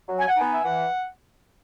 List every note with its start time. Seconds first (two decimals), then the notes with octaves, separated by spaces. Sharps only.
0.09 F#3
0.18 G#5
0.28 F#5
0.37 B3 D#4 G#5
0.53 E5
0.63 E3 F#5